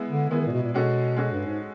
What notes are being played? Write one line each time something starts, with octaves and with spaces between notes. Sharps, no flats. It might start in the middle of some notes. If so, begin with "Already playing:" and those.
Already playing: G#3 B3 E4
D3
D#3 G#3 B3 E4
D#3
A#2
B2
A#2
B2 G#3 C#4 F#4 A4
G#3 C#4 F#4 A4
G2
G#2